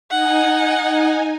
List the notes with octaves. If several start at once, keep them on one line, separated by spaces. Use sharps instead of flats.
D#4 F#5 G#5